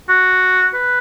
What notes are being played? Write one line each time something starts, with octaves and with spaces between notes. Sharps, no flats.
F#4
B4